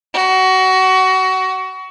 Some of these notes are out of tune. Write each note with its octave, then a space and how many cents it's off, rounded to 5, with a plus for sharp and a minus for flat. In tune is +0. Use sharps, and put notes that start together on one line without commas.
F#4 +20